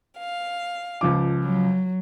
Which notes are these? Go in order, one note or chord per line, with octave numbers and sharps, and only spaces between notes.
F5
C#2 F3 D6
F#3